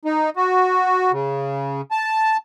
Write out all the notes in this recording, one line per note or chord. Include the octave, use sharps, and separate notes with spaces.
D#4
F#4
C#3
A5